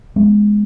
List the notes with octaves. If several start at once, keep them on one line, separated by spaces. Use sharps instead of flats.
G#3 B3